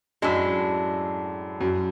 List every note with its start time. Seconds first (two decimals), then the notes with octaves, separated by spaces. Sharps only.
0.22 F#2 A2 G#3 D4
1.61 F#2